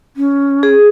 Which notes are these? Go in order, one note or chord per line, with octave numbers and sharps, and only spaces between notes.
C#4
G#4